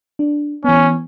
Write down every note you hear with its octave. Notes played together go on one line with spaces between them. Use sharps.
D4
E3 B3 C#4